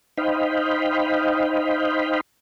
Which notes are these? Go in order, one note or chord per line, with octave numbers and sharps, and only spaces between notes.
D#4 C5 D#5 F5 G5 B5